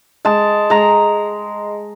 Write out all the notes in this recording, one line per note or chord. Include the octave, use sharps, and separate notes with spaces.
G#3 A5
G#3 A#5